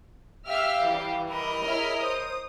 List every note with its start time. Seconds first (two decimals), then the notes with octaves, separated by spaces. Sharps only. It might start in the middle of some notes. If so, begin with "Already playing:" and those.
0.47 G4 E5 F5 F6
0.87 E3 G3
1.29 A#4 D#5 B5
1.65 E4 G#4 C#5 E5 F6
2.01 C5 D#6